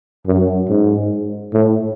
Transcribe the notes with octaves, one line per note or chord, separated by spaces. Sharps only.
F#2
G#2
A2